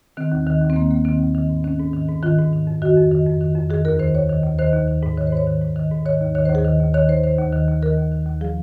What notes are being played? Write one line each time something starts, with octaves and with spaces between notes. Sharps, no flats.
D#3 C4
D#2
D#3
D#2
C4
D#3 A#3
D#2 A#3
D#3 C4
D#2
D#3
G#2
D#3 C#4
G#2
D#3
G#2
D#3 F4
G#2
D#3
F2
D#3 F#4
F2
D#3
F2
D#3
F2
D#3 G#4
D#2 A#4
D#3 C5
D#2 C#5
D#3
D#2
D#3 C5
D#2
D#3
G#2
D#3 C#5
C5
G#2 C#5
D#3
G#2
D#3
G#2
D#3 C#5
D#2
D#3 C#5
C5
D#2 G#4
D#3
D#2
D#3 C#5
D#2 C5
D#3 C5
D#2
D#3
D#2
D#3 A#4
D#2
D#3
D#2
F3 G#4